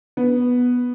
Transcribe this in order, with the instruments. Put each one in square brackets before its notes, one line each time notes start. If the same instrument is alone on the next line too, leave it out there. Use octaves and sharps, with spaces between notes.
[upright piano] B3